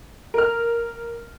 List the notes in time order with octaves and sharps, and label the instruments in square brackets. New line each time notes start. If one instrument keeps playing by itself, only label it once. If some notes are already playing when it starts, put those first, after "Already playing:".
[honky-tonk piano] A#4 F6